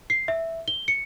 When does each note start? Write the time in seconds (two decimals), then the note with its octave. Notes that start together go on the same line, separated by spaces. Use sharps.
0.10 C7
0.28 E5
0.68 G7
0.88 C#7